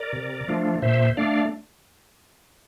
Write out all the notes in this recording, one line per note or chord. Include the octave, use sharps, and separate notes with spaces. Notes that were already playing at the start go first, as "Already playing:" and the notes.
Already playing: A#4 D5
C3
F3 A3 D4 F4
A#2 C5 E5
A3 D4 D5 F5